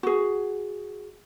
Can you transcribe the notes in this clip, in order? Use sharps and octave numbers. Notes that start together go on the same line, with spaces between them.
F#4 G#4